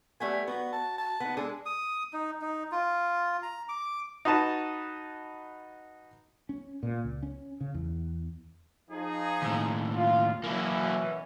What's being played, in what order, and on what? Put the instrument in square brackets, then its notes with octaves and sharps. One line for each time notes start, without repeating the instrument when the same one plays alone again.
[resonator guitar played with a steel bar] G3 A3 B3 [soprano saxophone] G#5
[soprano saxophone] B3 [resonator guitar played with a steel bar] F#4
[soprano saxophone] A5
A5
[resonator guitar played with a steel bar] B3 D#4
[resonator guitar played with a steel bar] G#3 G#4 A4 [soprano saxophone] D4
[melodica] D#6
D#4
D#4
F4
A#5
D6
[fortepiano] D#4 F#4 B4 A5
[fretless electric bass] C#4
A#2
C#2
C#4
C#3
E2
[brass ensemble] F3 D#4 G#4
[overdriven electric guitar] D#2 A2
[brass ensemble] F4
[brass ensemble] B2 E3 C#4 [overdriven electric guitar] F#3 A#3